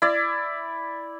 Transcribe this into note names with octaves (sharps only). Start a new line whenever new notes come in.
E4 D5